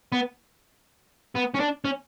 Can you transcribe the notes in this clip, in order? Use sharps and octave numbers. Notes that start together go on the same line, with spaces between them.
B3
B3
C#4
D4
C#4